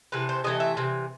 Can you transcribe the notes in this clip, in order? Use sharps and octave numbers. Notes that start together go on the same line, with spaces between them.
C3 E3 A3 B4
C5
C3 E3 A3 D#5
E5
C3 E3